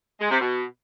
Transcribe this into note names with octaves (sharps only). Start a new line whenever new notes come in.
G#3
C3
B2